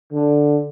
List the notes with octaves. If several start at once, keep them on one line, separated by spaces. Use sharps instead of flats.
D3